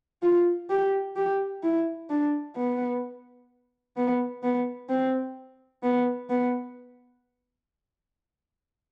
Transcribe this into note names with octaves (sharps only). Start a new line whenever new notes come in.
F4
G4
G4
E4
D4
B3
B3
B3
C4
B3
B3